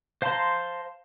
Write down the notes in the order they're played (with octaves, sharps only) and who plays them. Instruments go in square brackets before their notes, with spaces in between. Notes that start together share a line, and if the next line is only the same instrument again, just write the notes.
[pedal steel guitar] C5 F5 A5 A#5 C6